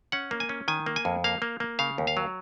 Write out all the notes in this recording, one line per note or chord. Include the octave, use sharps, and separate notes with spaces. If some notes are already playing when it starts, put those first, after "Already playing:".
C#4 F#5
A#3
G#5
C#4
D#3 G#5
A#3
G#5
F2
A#3 F5
A#3
A#3
C#3 F5
D#2
F5
F#3